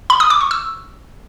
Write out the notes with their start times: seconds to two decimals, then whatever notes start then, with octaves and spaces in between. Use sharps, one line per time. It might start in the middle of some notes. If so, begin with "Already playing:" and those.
0.10 B5
0.20 D#6
0.30 D6
0.41 C#6
0.51 E6